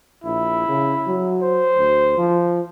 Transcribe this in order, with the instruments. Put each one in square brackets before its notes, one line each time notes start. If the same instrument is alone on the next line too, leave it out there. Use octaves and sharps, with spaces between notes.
[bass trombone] A#1 [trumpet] E4
[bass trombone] C#3
F#3
[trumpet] C5
[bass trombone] D2
F3